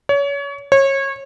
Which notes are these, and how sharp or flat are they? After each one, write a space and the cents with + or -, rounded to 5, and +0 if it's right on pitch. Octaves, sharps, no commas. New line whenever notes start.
C#5 +30
C#5 -25